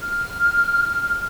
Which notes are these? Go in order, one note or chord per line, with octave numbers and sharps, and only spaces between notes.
F6